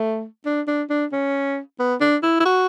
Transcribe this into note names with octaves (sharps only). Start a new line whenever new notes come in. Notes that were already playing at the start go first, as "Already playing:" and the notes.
Already playing: A3
D4
D4
D4
C#4
B3
D4
E4
E4
F#4